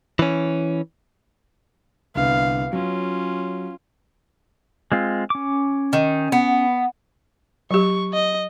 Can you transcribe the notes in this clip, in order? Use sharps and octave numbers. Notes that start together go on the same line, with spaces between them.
E3 C#4
C2 D3 B3 F5
F#3 C#4 F4
G#3 C4 F4
C#4 D6
D#3
B3
F#3 G4 C#6
D#5